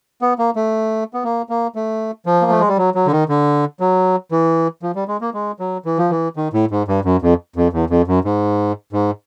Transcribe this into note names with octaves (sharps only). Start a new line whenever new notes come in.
B3
A#3
A3
B3
A#3
A#3
A3
F3
A#3
A3
G#3
G3
F#3
F#3
D3
D#3
D3
F#3
E3
F3
G3
G#3
A#3
G#3
F#3
E3
F3
E3
D#3
A2
G#2
G2
F#2
F2
F2
E2
F2
F#2
G#2
G#2